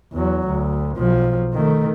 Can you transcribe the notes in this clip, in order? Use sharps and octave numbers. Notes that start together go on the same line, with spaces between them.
E2 F#3
D2
B1 F3
D#3 A3